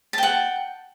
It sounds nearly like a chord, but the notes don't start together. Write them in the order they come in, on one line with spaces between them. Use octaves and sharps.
A5 G5 F#5